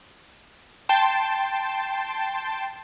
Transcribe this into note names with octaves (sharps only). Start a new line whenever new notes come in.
G5 A5 C6